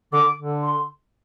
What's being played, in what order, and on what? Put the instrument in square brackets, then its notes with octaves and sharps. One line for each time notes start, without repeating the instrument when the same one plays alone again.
[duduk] D3 [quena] D6
[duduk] D3
[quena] C6